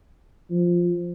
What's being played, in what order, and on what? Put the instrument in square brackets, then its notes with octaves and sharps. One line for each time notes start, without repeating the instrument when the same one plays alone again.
[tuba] F3